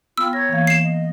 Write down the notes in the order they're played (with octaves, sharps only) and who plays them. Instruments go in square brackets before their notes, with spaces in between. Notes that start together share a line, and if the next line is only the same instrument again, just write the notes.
[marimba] B3 G5 [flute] F4 [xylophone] E6
[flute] C#5 [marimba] A#5 A#6
[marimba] E3 A#3 F5
[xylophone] C7 E7
[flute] D#5